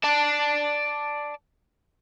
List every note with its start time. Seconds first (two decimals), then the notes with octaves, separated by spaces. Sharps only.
0.04 D5 A5